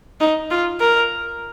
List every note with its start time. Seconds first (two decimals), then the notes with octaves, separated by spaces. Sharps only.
0.20 D#4
0.51 F4
0.80 A#4